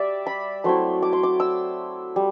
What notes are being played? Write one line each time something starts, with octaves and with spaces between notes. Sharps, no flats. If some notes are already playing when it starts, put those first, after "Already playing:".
Already playing: G3 D5 E5
B5
F#3 A3 C4 E4 C6
D6
C6
D6
E6
G3